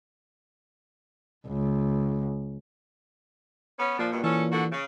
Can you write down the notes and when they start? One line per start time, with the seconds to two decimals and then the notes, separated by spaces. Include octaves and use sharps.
1.48 C#2
3.79 B3 C#4
3.99 A#2 F3 D4
4.12 G2 B2
4.24 E3 C#4 A4
4.52 D3 F#4
4.72 C#3